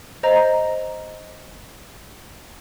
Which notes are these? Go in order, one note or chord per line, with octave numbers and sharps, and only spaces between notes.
C5 D#5 A#5